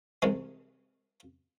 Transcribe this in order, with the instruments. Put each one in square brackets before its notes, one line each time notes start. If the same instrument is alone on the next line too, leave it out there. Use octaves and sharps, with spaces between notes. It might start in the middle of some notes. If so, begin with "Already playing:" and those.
[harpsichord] C2 C3 E3 G#3 C#4